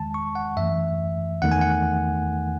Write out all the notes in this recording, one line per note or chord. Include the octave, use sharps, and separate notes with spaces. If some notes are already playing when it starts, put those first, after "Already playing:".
Already playing: E2 D#3 G#3 A5
C#6
F#5
F#2 E3 A3 E5
E2 D#3 A3 F#5
G#5
F#5